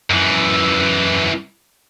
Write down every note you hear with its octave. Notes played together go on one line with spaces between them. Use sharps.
F#2 E3